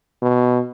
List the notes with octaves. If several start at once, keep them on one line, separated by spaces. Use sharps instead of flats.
B2